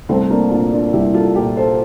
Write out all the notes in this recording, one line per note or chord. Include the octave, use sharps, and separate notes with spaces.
C2 A3 C4
A#3 D4
A#2 D4 F4
D4 F4
C2 E4 G4
F4 A4
A#2 G4 A#4
A4 C5